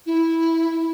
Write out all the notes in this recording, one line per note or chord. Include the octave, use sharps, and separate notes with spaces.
E4